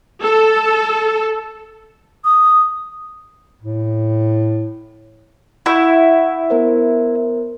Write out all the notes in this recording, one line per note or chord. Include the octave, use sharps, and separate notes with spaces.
A4
D#6
A2
E4 F#5 C#6 G6
B3 A#4 C5